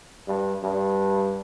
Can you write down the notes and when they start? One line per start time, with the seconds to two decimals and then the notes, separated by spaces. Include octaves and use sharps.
0.28 G2
0.63 G2